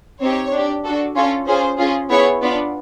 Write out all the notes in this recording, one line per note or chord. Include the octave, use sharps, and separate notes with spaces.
C4 D#4 G4 C#5
D4 G4
D4 F#4 A4
C#4 F4 A4 C#5
C#4 F4 G#4 C5
C#4 F4 G#4
B3 E4 G#4 C#5
B3 D4 F4 D5